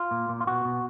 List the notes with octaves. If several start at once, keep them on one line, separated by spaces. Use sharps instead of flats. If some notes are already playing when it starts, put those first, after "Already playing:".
Already playing: F4
A#2
A#2
F4
B2 F#4
B2